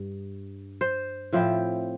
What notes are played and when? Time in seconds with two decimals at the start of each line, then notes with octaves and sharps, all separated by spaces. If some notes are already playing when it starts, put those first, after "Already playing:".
Already playing: G2
0.81 C5
1.33 A2 F3 C4 E4